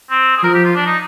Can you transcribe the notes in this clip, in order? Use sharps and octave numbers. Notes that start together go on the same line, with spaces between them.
C4
G#4
F3 A#4
G4
F4
D4
D#4